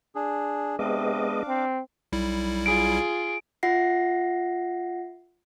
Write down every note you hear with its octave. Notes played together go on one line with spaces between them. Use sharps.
D4 G#4
C3 G#3 B3 D4 D#5 F5 D6
C4
B1 G3 E4
F4 G#4 D7
F4 E5 F#5 A#6 C7